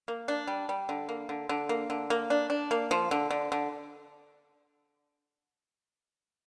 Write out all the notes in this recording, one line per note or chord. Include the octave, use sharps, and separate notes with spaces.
A#3
D4
G3
G3
D3
A#3
D3
D3
A#3
D3
A#3
D4
D4
A#3
F3
D3
D3
D3